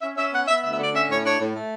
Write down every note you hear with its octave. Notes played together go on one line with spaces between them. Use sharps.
C#4 E5
C#4 E5
B3 F#5
B3 E5
D2 E5
E5
D3 D5
C#4 E5
A2 C#5
D4 C#5
A2
A3